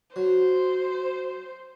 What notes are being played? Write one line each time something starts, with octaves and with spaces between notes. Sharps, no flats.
F#3 C5